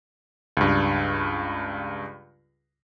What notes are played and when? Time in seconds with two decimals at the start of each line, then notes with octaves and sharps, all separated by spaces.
0.57 C#2 G2